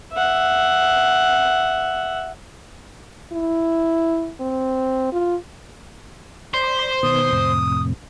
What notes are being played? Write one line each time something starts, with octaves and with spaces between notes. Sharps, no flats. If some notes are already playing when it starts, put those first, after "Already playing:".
E5 F#5
E4
C4
F4
C5 D5 B5
B2 D#3 B3 D#6
F2 A2 C3